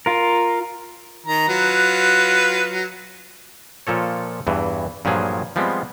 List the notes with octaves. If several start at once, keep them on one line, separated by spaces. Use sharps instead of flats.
F4 A#4
D#3 A#5
F#3 F4 B4
A#2 F3 A4 C#5
E2 G2 E3
G2 A#2 F3 F#3 G#4
F3 G3 G#3 B3 C4